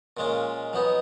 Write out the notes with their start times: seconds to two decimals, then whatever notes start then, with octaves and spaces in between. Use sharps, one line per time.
0.17 A#2 G#3 C#4 F4
0.73 F#3 B3 D#4